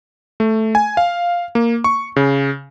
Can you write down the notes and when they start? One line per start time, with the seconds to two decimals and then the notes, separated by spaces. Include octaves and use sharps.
0.40 A3
0.75 G#5
0.97 F5
1.55 A#3
1.84 C#6
2.16 C#3